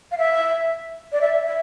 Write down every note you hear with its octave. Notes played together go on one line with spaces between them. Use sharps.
F5
E5
D5
E5
E5